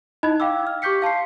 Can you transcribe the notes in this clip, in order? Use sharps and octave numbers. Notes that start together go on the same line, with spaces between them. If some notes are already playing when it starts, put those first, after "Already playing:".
D#4 E4 D#5 B5 F#6 G#6
F5 G5 D6 E6
F6
G4 C#6 D6 G6 B6 C#7
F5 A5 C6 C7